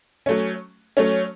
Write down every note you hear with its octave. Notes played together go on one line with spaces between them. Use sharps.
F#3 A3 C#4
F#3 A3 C#4